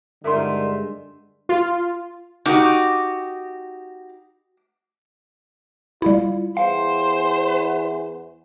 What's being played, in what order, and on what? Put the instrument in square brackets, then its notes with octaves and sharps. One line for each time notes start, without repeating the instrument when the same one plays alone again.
[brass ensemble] G2 D3 G#3 [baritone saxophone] D#3 [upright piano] E5 C6
[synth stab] F4
[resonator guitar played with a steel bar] D#4 F#4 G4 [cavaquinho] D6
[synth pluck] G3 E4 [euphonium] F4
[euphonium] E2 [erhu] C5 [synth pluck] F5